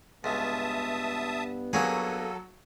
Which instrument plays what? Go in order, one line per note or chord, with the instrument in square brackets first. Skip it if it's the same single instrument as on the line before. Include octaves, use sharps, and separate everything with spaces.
[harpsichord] C#2 [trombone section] G2 B3 [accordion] E5 A5 D#6
[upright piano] F#3 F#4 [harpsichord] A#3 C#4 G#4 [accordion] A4